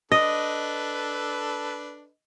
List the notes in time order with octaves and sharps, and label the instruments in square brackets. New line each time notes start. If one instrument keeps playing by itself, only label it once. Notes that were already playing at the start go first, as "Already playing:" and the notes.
[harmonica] D4 A4 B4 [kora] D#5